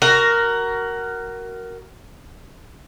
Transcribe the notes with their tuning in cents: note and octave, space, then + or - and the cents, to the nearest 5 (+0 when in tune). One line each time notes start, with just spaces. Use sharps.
F#4 +20 A#4 +0